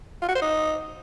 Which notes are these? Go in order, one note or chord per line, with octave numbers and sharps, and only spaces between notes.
F4
F#4
C5
D#4